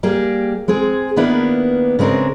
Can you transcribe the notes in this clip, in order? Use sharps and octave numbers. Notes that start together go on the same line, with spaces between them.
G3 A#3 G4 G#4
G#3 C4 G#4
D#3 A#3 B3 D4 E4
C#3 G#3 C4 D4 A#4